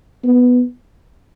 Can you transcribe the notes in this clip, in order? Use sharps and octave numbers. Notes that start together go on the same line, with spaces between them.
B3